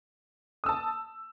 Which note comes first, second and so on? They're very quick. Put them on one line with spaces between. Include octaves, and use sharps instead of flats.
D#6 E6 A5